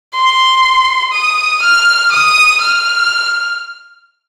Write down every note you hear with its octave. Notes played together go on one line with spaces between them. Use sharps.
C6
D#6
F6
D#6
F6